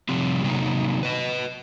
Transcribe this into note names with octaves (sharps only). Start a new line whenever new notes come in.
C3 F3 G3 C4
C3 F#3 A#3 D#4
B4 D#5